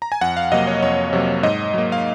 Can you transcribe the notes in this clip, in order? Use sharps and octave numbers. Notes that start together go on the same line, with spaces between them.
A#5
G#5
F2 F#5
F5
C3 F#3 A#3 D#5
C#5
F2 C#5
C3 F#3 A#3
G#2 D#5
F#3 A#3
F5